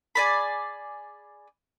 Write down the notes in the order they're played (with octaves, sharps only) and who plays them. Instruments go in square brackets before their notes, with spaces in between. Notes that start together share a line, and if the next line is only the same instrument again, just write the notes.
[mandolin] G#4 D5 B5